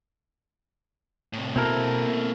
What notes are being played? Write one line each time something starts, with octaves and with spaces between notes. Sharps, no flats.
A2 C3
B2 A#3 C4 E4 A4 A#4